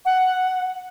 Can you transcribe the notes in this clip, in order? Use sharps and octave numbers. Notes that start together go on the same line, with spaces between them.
F#5